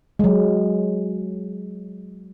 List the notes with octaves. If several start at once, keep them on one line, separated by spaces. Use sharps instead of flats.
F#3 G#3